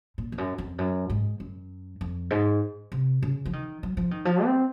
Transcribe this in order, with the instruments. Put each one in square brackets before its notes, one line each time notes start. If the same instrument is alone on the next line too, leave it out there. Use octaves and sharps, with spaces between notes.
[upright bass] A#2
F2
F#2
F2
F#2
G#2
F#2
F2
G#2
C3
C#3
F3
D#3
F#3
F3
D#3
F3
C4